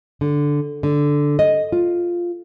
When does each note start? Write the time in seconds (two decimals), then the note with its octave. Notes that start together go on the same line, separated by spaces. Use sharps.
0.21 D3
0.83 D3
1.39 D#5
1.72 F4